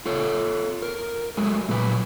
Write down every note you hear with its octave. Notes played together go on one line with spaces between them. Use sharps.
F4 A4 C#5
A#4
F#3 G#3 A3
A#2 F#3 B4